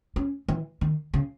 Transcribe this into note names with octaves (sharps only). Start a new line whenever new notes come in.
C#4
E3
D#3
C#3